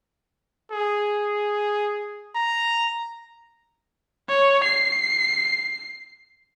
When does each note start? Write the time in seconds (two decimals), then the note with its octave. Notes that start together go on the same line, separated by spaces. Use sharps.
0.71 G#4
2.35 A#5
4.29 C#5
4.64 C7